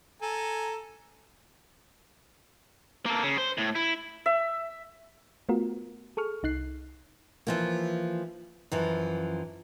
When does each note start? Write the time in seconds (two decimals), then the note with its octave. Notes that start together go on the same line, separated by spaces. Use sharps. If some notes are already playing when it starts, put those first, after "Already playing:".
0.22 A4 G#5 A#5
3.06 A#3 A4
3.23 C#3
3.38 C5
3.58 A2
3.75 E4
4.26 E5
5.49 A3 B3 F4 F#4 A#4
6.17 G#4 A4 C#6 F6
6.43 C2 D#4 F#6 C7
7.47 E3 F3 A#3
8.72 F#2 E3 F3